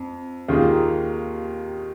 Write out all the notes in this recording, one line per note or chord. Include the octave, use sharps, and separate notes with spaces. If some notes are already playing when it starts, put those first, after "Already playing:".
Already playing: F2
D#2 D#3 A#3 F4 G#4